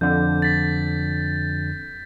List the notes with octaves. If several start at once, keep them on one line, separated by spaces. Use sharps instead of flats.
F2 D3 G6
A6 B6